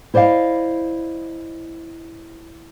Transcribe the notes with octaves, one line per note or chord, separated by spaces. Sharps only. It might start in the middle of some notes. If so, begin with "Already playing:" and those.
E4 C5 D5 D#5 F5